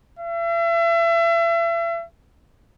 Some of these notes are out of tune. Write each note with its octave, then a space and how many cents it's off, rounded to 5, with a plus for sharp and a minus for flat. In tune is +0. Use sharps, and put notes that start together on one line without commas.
E5 +35